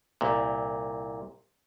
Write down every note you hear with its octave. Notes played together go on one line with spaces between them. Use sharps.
C2 A#2